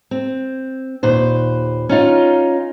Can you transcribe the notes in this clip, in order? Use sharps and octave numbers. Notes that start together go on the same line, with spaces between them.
C4
D#2 A#2 B4 C5
C#4 D#4 F4